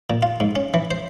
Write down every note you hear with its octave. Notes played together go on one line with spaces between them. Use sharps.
A#2
F4
G#2
C#4
E3
C5